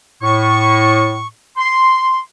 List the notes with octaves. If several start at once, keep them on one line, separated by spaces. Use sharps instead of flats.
A2 C#6
C6